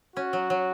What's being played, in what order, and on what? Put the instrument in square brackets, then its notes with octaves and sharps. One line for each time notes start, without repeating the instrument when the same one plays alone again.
[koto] C#4 [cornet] F#4
[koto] F#3
F#3